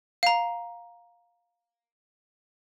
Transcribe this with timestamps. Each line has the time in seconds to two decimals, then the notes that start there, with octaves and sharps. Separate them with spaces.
0.23 F5 A#5